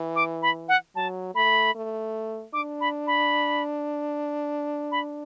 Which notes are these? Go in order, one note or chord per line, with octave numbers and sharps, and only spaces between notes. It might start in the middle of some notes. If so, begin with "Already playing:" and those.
Already playing: E3
D6
B5
F#5
F#3 A5
A3 B5
A3
D4 D6
B5
B5
B5